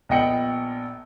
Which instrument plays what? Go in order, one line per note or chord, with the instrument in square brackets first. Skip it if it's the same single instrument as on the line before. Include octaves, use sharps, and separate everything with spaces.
[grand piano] A#1 B3 D#5 G5 C#7 F#7